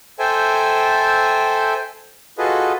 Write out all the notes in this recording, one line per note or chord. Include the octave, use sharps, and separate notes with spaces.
A4 C5 E5 G5 G#5
F4 F#4 G#4 A4 B4 D#5